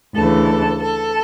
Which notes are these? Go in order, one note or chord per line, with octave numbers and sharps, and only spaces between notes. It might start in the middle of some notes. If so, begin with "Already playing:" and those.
D2 C#3 E3 A4
A4